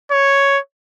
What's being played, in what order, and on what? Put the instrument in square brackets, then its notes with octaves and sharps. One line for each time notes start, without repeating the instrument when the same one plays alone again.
[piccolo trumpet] C#5